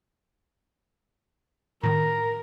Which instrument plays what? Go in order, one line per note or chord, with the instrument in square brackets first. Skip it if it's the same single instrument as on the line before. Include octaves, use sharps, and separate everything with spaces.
[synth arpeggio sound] A2 D#3 [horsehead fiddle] A#4 [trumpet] A#5